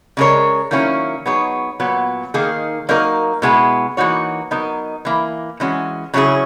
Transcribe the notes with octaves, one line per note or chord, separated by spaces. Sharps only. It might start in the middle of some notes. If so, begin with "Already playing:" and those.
C#3 G#3 D#4 A#4 C#5
D#3 F#3 A#3 C#4 E4
F#3 B3 D#4 G#4 C#5
A#2 F#3 B3
D#3 A#3 D#4 G#4
F#3 A#3 D#4 A#4
B2 G#3 B3 E4 G#4
E3 A#3 D#4 F#4 C#5
F#3 B3 D#4 A#4 D#5
E3 A#3 E4
E3 G#3 C#4 F#4
C#3 F#3 C#4 E4 G#4